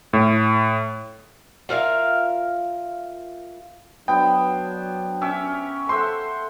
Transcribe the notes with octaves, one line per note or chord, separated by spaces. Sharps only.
A2
F4 A#4 E5 F5
F#3 B3 D4 C5 G5
C#4 G4 E5
A4 C5 E5 F#5 C6